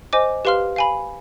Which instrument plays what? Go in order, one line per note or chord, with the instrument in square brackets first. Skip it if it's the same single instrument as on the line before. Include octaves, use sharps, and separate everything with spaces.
[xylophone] C5 D#5 G#5 D6
G4 B4 F5 C6 F6
F5 G#5 B5